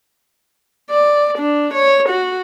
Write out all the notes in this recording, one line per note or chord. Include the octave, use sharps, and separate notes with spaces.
D5
D4
C#5
F#4